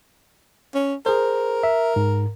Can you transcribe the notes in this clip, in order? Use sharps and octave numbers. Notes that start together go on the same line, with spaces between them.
C#4
G#4 A#4 C5
E5
G#2